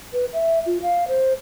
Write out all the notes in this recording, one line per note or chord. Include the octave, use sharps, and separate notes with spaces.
B4
E5
F4
F5
C5